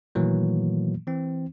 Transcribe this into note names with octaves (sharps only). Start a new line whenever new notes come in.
A#2 D#3 E3 F#3 A3 A#3
E3 C4